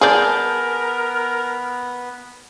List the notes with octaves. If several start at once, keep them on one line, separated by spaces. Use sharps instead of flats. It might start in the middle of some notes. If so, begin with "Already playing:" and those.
B3 G#4 A#4 D5 G#5 A5 G6